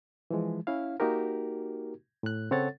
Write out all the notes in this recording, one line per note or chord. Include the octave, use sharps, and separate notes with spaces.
E3 F3 G#3
C#4 E4 F5
A#3 D#4 F#4 G4 A#4
A2 F#6
C#3 C4 A4 C#5 F#5 A6